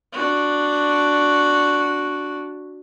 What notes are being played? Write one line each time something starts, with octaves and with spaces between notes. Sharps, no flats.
D4 F#4